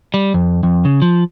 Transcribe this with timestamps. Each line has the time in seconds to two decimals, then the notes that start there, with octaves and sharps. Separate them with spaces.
0.14 G3
0.34 F2
0.63 F2
0.85 C#3
1.02 F3